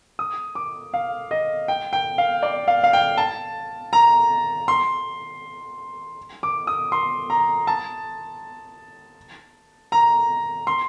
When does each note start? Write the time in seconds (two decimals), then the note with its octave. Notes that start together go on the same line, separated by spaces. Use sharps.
0.19 D#6
0.55 D6
0.94 F5
1.31 D#5
1.68 G5
1.93 G5
2.18 F5
2.43 D5
2.68 F5
2.84 F5
2.93 G5
3.18 A5
3.93 A#5
4.68 C6
6.43 D6
6.67 D#6
6.92 C6
7.30 A#5
7.67 A5
9.92 A#5
10.67 C6